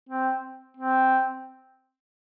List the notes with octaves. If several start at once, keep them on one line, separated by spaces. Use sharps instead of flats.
C4
C4